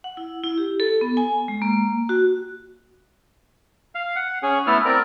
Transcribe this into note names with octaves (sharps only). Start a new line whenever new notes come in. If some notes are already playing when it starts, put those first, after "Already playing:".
F#5
E4
E4
G4
A4
B3
G#5
G#3
A#3
F#4
F5
F#5
C#4 G#4
A3 B3 E4 A4 F6
C4 A#4 D5